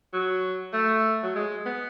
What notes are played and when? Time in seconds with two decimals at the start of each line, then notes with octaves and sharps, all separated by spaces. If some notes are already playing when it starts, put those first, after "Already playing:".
0.13 F#3
0.73 A3
1.23 F#3
1.35 G#3
1.66 B3